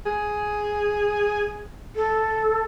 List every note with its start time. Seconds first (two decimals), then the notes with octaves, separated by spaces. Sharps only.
0.06 G#4
1.96 A4